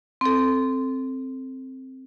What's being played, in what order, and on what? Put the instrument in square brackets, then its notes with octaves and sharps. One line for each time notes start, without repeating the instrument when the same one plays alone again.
[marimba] C4 A4